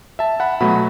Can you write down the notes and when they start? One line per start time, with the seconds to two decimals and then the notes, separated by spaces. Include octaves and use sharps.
0.19 E5 A5
0.40 F#5 B5
0.60 B2 F#3 A3 F#5 B5